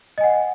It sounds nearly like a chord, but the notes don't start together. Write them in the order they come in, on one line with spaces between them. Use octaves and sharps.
D#5 G#5 F#5